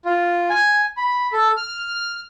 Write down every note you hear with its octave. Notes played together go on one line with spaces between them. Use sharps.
F4
G#5
B5
A4
F6